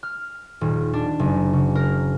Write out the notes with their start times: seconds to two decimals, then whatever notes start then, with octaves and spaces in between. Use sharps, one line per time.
0.03 F6
0.61 D#1
0.93 D4
1.19 F#1
1.53 C#3
1.75 A#4